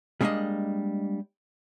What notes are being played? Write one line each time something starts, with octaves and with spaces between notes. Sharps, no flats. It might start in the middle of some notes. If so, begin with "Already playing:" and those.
G3 G#3 A#3 C#4 D4 D#5